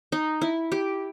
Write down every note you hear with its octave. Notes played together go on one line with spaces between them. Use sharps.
D#4
E4
G4